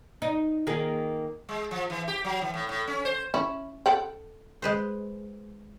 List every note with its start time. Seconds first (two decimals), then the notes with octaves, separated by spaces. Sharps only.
0.22 D#4
0.67 D#3 A#3 G#4
1.49 G#3
1.71 F3
1.90 E3
2.08 G4
2.24 F#3
2.41 E3
2.54 A2
2.69 A2
2.87 C#4
3.05 C5
3.34 C#4 E4
3.86 A4 F#5 G5
4.62 G#3 B4 C5